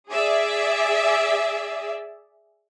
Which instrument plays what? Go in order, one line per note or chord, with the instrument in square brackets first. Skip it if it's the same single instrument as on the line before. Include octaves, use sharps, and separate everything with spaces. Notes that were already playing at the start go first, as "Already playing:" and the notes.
[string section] G#4 D5 E5